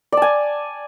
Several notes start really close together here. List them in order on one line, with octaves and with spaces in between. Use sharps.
D5 A5 G#5